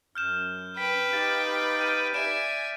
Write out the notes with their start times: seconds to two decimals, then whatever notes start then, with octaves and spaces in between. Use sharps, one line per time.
0.15 F#2 F6 G6 E7
0.77 B4 G5 B6
1.13 D#4 G4 F5 A6
1.81 G6 D#7
2.14 D5 E5 G#5 D7 E7